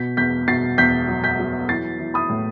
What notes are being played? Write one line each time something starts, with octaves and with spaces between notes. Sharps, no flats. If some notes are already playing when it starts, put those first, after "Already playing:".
Already playing: B2 G6 B6
E2 G6 B6
B2 A6 C7
E2 G6 B6
F#3
G6 B6
F#3
E3 A6 C7
E3
B5 D#6
A2